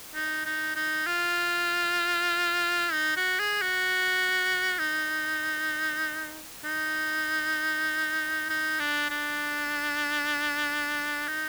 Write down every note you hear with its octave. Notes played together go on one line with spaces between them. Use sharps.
D#4
D#4
D#4
F4
D#4
F#4
G#4
F#4
D#4
D#4
D#4
D4
D4
D#4